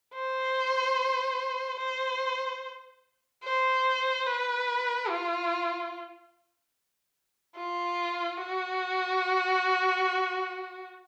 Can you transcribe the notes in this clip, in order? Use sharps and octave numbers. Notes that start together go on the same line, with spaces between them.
C5
C5
C5
B4
F4
F4
F#4